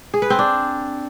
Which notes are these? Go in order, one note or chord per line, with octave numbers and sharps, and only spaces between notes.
G#4
B4
C4
D4